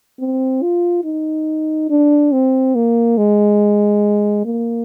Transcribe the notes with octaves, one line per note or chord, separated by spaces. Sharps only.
C4
F4
D#4
D4
C4
A#3
G#3
A#3